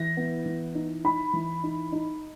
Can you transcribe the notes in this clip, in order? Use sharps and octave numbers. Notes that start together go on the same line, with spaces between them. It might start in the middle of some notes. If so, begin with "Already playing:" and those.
Already playing: E3 A#6
B3
E3
D#4
D#4 B5
E3
D#4
D#4